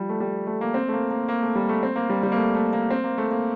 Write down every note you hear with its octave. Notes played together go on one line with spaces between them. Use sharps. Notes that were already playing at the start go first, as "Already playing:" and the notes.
Already playing: F3 G3
A3
G3
A3
A#3
C4
A3
A#3
A#3
A#3
A3
G3
A3
C4
A#3
G3
G3
A#3
A3
A3
A#3
C4
A#3
A3
A#3